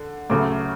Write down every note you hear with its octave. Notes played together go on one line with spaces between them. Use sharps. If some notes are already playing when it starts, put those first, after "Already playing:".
Already playing: D3
D2 C#3 F#3 A3 D6